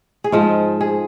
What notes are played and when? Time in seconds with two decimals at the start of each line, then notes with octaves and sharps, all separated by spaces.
0.24 G#4
0.32 G#2 F3 F4
0.81 G#4